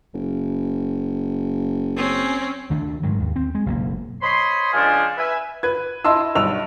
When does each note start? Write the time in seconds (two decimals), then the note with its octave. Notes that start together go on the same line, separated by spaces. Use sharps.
0.14 F#1
1.96 C4 C#4
2.70 D2 D#3 A3 D4
3.03 G#2 D#3 F#3
3.20 D#2
3.36 C4
3.55 G#3
3.66 F#1 B1 A#3
4.21 C5 C#5 D#5 B5 C6
4.73 C#2 F3 D4 A4 F5 G#5
5.17 B4 E5 G#5
5.63 B4 G#6
6.05 E4 D#5 A5 C6 E6
6.35 B1 G2 E6 F7